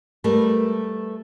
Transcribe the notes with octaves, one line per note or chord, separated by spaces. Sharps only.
G3 A3 A#4 B4